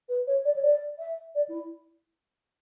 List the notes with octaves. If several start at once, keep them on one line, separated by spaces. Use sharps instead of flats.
B4
C#5
D5
C#5
D5
E5
D5
E4